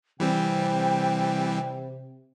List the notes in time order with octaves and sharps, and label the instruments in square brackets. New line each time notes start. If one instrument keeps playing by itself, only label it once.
[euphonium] C3 [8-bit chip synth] E3 G3 C4 [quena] G5